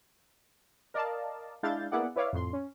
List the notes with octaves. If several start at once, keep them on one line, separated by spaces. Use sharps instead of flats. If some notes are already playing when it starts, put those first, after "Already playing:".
A#4 D5 D#5 F5 A5
G#3 D4 E4 F5 G6 A6
A#3 B3 E4 G#4 D5 F#5
E4 B4 C#5 D5 E5 F5
F2 A2 C6
C#4